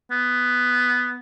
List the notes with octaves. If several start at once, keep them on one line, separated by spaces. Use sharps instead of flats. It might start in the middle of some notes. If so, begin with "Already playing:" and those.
B3